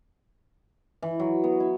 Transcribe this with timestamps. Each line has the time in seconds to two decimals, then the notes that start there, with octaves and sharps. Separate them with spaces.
1.02 E3
1.20 F#3
1.44 B3
1.60 E4